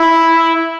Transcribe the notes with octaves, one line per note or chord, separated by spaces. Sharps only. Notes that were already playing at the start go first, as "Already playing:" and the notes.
Already playing: E4